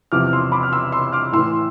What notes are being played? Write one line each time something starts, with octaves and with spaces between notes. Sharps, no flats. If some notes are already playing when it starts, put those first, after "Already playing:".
E2 C3 F3 D6 F6
F6
C6 E6
B5 D6
F6
C6 E6
C6 E6
D6 F6
A2 E3 C6 E6